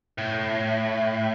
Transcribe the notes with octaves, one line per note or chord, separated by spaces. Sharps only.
A2